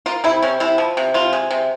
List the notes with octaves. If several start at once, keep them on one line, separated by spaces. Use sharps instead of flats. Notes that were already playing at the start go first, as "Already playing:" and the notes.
A#3 F4
C3 E4
C3 C#4
C3 E4
F3
C3
C3 F4
G#3
C3